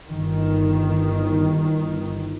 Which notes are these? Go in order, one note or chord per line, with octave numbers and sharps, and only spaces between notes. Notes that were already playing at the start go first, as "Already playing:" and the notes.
G1 D#3